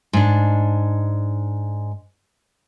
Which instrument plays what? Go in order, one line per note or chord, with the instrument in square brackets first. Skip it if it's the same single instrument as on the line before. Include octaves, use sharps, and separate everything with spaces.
[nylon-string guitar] G#2 D4